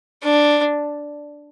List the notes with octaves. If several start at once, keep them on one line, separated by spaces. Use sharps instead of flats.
D4